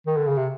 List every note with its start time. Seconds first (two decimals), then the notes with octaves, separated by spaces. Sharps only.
0.07 D#3
0.17 D3
0.27 C#3
0.37 C3